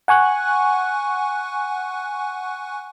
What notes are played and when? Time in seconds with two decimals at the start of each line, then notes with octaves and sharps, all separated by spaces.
0.08 F#5 G#5 C#6 F#6